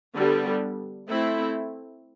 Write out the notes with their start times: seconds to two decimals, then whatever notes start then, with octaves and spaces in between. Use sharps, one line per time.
0.16 D3 G3 B3
1.09 A3 C4 E4